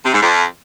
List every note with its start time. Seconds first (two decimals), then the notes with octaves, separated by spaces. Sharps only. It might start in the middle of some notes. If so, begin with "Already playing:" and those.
0.05 C3
0.14 G#2
0.22 F2